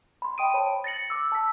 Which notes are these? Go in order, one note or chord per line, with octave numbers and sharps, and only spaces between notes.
B5 C6
D#5 G5 C6 D#6 D7 D#7
C5 C#5 G5 A5 B5
A6 A#6 C#7 F#7
D6 E6
A5 E6 B6